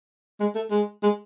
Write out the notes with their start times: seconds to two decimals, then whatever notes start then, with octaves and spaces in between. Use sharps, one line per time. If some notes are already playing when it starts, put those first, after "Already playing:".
0.40 G#3
0.55 A3
0.71 G#3
1.03 G#3